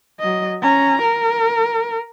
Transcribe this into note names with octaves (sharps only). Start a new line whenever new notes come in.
F#3 D#5
C#4 A#5
A#4